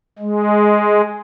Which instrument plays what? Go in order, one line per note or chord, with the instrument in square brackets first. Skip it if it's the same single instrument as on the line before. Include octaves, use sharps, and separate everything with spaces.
[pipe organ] G#3